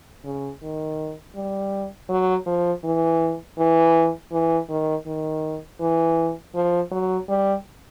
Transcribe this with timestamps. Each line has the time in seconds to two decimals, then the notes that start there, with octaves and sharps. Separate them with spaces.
0.25 C#3
0.62 D#3
1.35 G3
2.09 F#3
2.46 F3
2.84 E3
3.58 E3
4.32 E3
4.69 D#3
5.06 D#3
5.80 E3
6.55 F3
6.91 F#3
7.29 G3